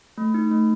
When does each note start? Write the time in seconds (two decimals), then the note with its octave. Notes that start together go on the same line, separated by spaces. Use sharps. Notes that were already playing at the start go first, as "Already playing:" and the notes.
0.18 A3
0.34 D#4
0.51 A3